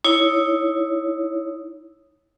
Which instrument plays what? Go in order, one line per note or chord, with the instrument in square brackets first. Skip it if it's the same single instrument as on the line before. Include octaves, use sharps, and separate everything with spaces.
[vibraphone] D#4 E4 C#5